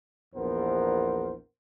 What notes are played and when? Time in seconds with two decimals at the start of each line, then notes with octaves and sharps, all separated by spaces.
0.34 A#1 E2 B3 A#4 C5